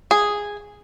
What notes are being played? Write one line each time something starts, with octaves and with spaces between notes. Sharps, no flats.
G#4